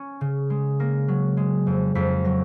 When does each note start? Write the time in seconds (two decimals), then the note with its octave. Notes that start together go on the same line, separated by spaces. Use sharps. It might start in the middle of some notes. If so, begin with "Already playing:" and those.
Already playing: C#4
0.21 C#3
0.50 G#3
0.80 A#3 A#6
1.08 F#3
1.37 G#3
1.67 F2
1.95 F2 B6
2.24 F#3 A#6